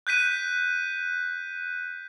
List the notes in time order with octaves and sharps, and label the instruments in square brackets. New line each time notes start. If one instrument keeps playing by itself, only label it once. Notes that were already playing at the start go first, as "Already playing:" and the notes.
[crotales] F#6 G6 B6 D#7